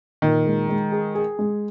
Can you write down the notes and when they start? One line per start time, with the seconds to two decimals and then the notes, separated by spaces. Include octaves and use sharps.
0.22 A#2 D#3
0.46 G#3
0.69 G#3
0.92 G#4
1.15 G#4
1.39 G#3